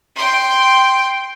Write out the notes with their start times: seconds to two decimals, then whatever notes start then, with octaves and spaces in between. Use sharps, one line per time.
0.16 G5 C6